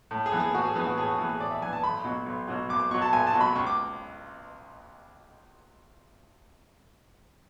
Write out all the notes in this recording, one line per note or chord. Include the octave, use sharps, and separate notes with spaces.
A2
G#4
E3 B3
G#4
A2 F#4
G#4
E3 B3 G#4
F#4
A2 G#4
F#4
E3 B3 G#4
G#4
A2 D5
E5
E3 B3 G#5
A5
B1 B5
B2 F#3
B1
B2 F#3
B1 D6
D6
B2 F#3 C#6
A5
B1 G#5
A5
B2 F#3
B5
C#2 C#6
D6